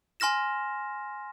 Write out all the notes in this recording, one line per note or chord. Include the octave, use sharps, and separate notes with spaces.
G#5 C6 F6 A#6 E7